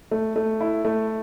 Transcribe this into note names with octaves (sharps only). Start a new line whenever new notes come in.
A3
A3
E4
A3